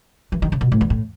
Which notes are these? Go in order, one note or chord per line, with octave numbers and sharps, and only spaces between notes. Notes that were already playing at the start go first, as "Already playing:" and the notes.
E3
D#3
C#3
B2
A2
E2
A2